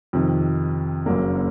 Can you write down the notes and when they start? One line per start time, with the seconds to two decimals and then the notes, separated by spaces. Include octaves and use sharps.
0.13 F2 C3 D#3
1.06 F#1 F#2 C#3 F#3 A#3